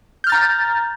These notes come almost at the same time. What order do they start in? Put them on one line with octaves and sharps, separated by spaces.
G6 F6 A6 A#5